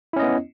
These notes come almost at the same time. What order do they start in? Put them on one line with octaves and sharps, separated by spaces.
E4 C#4 D#5 B3